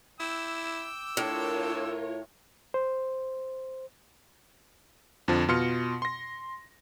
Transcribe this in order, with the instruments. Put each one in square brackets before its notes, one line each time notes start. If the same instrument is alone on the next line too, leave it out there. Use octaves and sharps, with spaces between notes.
[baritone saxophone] E4 [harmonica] G5 D6 E6
[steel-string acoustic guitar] A2 [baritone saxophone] D4 [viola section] F4 A#4 C#5
[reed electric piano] C5
[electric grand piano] F2 D3 F3
B2 F4 C6 F6 C#7
C6 A#6